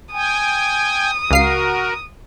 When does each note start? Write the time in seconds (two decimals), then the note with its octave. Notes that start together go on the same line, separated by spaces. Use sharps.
0.12 G5 G#5 D#6
1.31 C#2 F#4 A#4 F5 C7